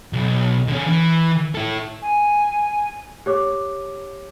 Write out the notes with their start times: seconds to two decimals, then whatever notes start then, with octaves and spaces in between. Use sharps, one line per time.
0.13 B1
0.68 D3 C#4
0.87 E3
1.55 E4 A4
2.01 G#5
3.26 G4 C#5 D6